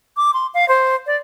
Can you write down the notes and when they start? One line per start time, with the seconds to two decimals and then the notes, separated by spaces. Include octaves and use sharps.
0.17 D6
0.34 C6
0.54 F5
0.68 C5
1.07 D5